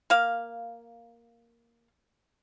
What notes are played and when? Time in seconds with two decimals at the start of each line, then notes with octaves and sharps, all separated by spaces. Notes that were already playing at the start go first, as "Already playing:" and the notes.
0.10 A#3 F5